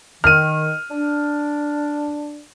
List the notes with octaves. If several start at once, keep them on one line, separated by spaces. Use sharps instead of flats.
D#3 F6 D#7
D4